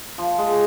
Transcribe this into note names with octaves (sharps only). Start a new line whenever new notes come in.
F3
G#3